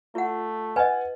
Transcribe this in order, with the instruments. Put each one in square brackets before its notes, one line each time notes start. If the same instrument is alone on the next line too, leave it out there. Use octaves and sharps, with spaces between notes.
[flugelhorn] A3 [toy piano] F4 F#5
[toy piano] B4 D#5 [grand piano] F#5 G#5